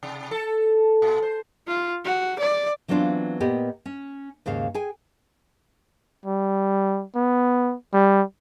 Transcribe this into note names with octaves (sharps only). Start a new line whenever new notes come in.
C3
A4
A#2
C5
F4
F#4
D5
E3 F#3 B3 C4 D4 F4
A#2 B3 G4 D#5
C#4
D#2 G#2 C#3 F5
G#4 G5 G#5
G3
B3
G3